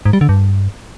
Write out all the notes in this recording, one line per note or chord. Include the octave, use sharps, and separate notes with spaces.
G#2
G3
D3
G2